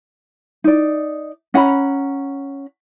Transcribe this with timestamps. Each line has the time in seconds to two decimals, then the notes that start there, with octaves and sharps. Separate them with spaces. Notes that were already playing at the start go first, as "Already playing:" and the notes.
0.64 D#4 D5
1.54 C#4 F#5 A#5 B5